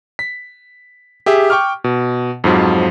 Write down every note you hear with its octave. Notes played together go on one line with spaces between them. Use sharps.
B6
G4 G#4 E5
G5 C#6 D6 F6
B2
F2 G#2 F3 F#3